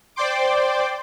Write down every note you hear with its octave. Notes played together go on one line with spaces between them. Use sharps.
C5 D5 G5 C6 D6